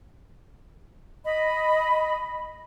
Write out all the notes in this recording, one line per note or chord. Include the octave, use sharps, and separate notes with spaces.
D#5 B5